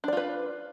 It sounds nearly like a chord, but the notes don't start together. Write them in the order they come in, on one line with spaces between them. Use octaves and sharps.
D4 D5 F4 B4